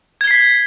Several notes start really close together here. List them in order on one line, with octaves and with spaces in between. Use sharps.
G#6 G7 C7 B6